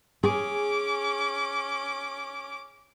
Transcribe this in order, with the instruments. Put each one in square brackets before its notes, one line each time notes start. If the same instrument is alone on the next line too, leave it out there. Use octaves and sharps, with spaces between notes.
[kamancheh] C#4 D6 [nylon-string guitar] G#4